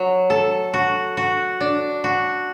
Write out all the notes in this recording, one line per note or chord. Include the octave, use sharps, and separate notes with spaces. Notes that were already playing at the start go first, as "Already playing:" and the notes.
Already playing: F#3
A4
F#4
F#4
D4
F#4